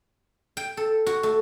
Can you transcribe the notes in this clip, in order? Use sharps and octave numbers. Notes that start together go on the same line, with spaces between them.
G5
A4
F#4
A3